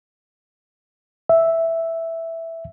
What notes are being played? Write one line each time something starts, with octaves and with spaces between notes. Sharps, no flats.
E5